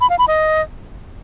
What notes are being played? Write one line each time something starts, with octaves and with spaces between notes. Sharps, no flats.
B5
F5
B5
D#5